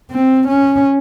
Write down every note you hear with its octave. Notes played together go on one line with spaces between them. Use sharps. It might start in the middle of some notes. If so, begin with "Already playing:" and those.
C4
C#4